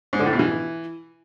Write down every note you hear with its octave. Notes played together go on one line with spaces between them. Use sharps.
G#2
D3
A2
B2
E3